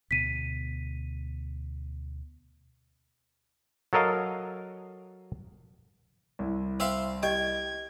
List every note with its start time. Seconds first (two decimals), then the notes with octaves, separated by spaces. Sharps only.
0.11 D2 B2 B6 D#7
3.93 F#3 A4 A#4 D#5 F5
6.39 C2 E4
6.80 C4 E5 F5 E6
7.23 G4 D#5 G5 G#6